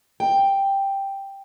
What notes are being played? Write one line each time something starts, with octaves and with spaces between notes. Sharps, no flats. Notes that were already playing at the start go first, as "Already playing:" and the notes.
G5